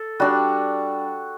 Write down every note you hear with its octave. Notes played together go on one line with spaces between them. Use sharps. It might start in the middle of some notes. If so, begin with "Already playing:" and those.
Already playing: A4
G3 D4 F#4